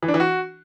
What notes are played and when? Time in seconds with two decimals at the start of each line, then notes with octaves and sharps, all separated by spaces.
0.03 E3
0.08 D4
0.14 E3
0.20 F#4